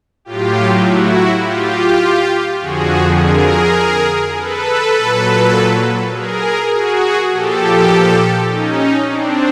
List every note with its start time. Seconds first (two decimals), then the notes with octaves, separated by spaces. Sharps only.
0.25 A2 F#3 F4 G4
0.84 E4 F#4
1.42 F4 G4
2.60 F2 D3 F3 F#4 G#4
3.20 G#4 A#4
4.37 A4 B4
4.97 A#2 F#3
6.14 G#4 A#4
6.73 F#4 G#4
7.31 A#2 F3 G4 A4
8.49 C#4 D#4
9.08 C4 D4